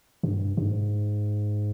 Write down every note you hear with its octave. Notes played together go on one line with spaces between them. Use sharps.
G2
G2
G#2